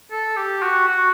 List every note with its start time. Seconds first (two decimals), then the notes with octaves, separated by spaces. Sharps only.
0.11 A4
0.37 G4
0.62 F#4
0.88 F#4